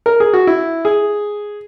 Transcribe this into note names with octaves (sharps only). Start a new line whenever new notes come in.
A#4
G#4
F#4
E4
G#4